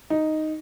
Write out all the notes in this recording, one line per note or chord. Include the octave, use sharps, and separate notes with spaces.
D#4